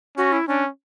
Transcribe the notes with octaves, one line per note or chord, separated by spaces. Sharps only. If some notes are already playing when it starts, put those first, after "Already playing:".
C#4 F#4
E4
C#4 D4